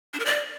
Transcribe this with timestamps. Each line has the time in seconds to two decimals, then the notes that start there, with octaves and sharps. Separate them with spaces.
0.14 D4
0.20 A#4
0.26 D5